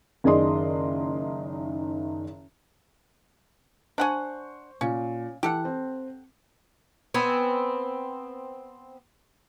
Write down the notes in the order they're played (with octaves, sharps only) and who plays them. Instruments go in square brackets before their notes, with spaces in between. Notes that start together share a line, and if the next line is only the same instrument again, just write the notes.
[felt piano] F#1 D#3 G#4 D5 D#5 C6
[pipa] D4 F#5 G#5 [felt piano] C5 C#6
[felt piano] A#2 [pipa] C#4
[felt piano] E3 [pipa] G4 A4 F#5
[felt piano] C4
[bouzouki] B3 C4 G#5